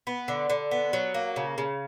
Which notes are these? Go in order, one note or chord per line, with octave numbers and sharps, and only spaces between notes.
B3
D3
D3
B3
F#3
A#3
C#3
C#3